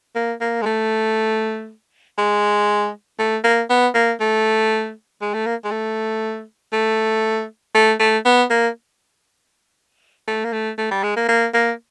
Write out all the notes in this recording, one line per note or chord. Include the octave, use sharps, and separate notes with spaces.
A#3
A#3
G#3
A3
G#3
A3
A#3
B3
A#3
A3
G#3
A3
A#3
G#3
A3
A3
A3
A3
B3
A#3
A3
A#3
A3
A3
G3
G#3
A#3
A#3
A#3